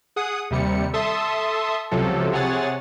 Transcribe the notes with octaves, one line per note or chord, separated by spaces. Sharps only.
G#4 F#5 D#6
D#2 C3 G3 C#7
A4 E5 A5 C6 D#6
C#2 C3 F3 F#3 A4
C3 G#4 C#5 F#5 G#5 A6